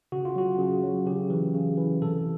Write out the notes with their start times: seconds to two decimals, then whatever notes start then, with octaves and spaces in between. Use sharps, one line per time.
0.12 C#3 F#4
0.25 F4
0.36 F#3 F#4
0.59 C#3
0.84 F#3
1.06 C#3 G4
1.30 E3
1.55 C#3
1.77 E3
2.02 C3 A4